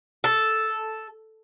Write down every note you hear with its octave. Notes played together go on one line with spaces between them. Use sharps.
A4